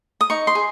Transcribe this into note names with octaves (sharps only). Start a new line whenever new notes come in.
D#6
D#4 C#6
C6
G#4